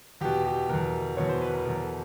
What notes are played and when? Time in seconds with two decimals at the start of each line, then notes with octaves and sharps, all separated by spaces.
0.21 E2 B2 G4
0.45 G4
0.69 E2 B2 A#4
1.17 E2 B2 C#5
1.29 C5
1.42 B4
1.53 A#4
1.65 E2 B2 A#4
1.82 A4